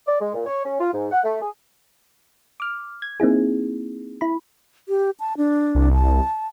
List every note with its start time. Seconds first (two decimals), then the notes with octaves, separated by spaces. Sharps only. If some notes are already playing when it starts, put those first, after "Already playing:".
0.07 D5
0.21 G#3
0.34 A#2
0.46 C#5
0.64 C#4
0.80 F4
0.93 G#2
1.11 F#5
1.23 A3
1.41 G#4
2.60 D6 F6
3.02 G#6
3.20 A#3 C4 D#4 E4 G#4
4.21 E4 B5
4.89 G4
5.20 A5
5.37 D4
5.75 C2
5.94 A5